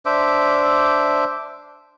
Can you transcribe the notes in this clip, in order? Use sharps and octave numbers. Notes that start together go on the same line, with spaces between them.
D4 C5 E5 D6